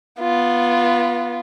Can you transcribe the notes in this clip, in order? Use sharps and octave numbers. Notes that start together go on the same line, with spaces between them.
B3 F4